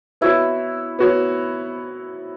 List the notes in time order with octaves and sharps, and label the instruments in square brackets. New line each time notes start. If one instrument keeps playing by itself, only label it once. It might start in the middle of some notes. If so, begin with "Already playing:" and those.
[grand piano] B3 F#4 C#5 [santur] E4
[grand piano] B3 F#4 C#5